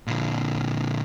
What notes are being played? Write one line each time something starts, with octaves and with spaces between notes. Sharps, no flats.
A#2 D3